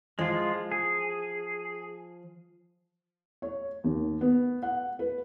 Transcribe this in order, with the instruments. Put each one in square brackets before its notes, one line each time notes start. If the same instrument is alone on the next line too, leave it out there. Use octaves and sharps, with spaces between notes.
[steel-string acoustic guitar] F3 [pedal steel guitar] G#3 F4
[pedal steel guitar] G#4
[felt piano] C#5
D#2
B3
F#5
B4